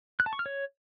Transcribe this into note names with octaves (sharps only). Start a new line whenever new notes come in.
F#6
A5
C#6
F6
C#5